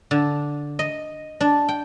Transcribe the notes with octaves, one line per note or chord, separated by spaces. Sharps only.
D3
D#5
D4
G5